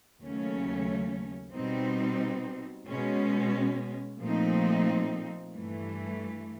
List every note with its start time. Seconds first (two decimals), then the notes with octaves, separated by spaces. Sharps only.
0.21 D#2 C#3 F#3 A3 C#4
1.54 B2 G3 C4 D#4
2.87 B2 G#3 C#4
4.21 A#2 F3 A3 C4 D#4
5.52 G2 E3 A3